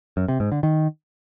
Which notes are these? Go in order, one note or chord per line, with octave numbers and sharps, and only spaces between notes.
F#2
C3
G#2
D3
D#3